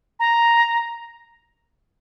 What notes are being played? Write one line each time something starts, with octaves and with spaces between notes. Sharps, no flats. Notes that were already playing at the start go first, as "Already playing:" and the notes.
A#5